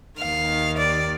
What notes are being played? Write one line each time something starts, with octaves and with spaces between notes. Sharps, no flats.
D#2 D#3 F5
D5